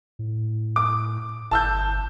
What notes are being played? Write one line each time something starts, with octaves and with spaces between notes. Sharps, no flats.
A2
D6
G1 A5 E6 G6